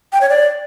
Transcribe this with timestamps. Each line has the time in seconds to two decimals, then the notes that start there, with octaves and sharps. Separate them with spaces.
0.13 G5
0.21 C#5
0.30 D5